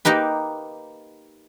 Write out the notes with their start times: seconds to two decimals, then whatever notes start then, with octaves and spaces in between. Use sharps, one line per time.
0.05 A#3 D#4 G4 B4